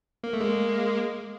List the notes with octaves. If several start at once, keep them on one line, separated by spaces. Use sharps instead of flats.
A#3
A3
G#3 A#3